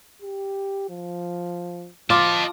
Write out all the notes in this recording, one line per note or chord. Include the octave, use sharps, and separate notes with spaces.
G4
F3
F3 F4 D#5 A5 D6